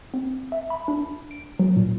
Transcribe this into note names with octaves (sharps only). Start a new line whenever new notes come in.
C4
E5
B5
D4
D7
F#3
A#2